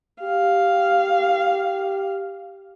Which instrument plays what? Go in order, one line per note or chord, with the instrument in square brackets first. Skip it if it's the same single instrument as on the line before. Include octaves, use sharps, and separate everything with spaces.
[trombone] G4 [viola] F5